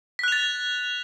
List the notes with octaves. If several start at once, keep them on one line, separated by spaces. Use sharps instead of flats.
F#6 A6 B6 F7